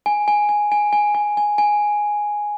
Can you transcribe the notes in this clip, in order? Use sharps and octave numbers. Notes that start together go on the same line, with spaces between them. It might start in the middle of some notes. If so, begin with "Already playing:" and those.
G#5
G#5
G#5
G#5
G#5
G#5
G#5
G#5